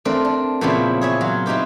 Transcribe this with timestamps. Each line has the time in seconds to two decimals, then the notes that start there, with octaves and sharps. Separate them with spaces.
0.05 A3 C4 D4 A#4
0.25 D4
0.61 A#2 C#3 F3 B3 C4 E4
1.01 G#4 C#5 E5
1.21 F#3 F4
1.46 C4 D#4 E4 G4 B4